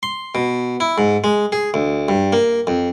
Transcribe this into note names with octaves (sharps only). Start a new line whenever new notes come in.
C6
B2
E4
G#2
G#3
G#4
D2
G2
A#3
F2